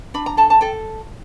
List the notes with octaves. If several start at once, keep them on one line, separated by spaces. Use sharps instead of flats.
D4 B5
A#5
A4 A5
A5
A4 G5